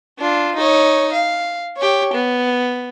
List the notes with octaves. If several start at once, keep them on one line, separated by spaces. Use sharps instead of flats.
D4 F4
D#4 C#5
F5
G4 C#5
B3